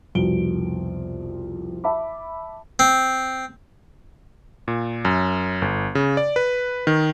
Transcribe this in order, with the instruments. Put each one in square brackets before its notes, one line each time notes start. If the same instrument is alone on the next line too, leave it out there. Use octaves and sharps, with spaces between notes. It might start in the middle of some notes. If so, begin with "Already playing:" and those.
[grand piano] C2 F2 B2 D7 G7
E5 A5 B5 D6
[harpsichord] C4
[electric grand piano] A#2
F#2
G1
C#3
D5
B4
D#3